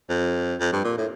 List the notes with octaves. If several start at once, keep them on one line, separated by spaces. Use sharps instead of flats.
F2
F2
G2
A#2
A2